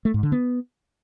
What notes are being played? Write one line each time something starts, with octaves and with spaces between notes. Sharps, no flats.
A3
G#2
D3
B3